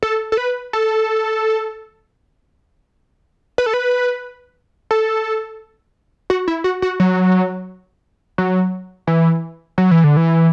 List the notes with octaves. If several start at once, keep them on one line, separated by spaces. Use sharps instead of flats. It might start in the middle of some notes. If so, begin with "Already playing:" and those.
A4
A4
B4
A4
B4
A4
B4
A4
F#4
E4
F#4
F#4
F#3
F#3
E3
F#3
E3
D3
E3